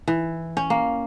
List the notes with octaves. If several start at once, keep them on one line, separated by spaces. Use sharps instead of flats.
E3
C#4
A#3